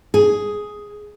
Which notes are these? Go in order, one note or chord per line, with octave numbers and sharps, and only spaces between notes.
G#4